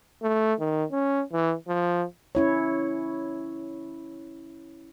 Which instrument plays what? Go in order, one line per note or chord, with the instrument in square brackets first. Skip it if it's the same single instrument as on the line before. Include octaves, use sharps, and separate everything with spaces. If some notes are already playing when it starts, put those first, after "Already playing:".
[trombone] A3
D#3
C#4
E3
F3
[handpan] C#4 E4 C#5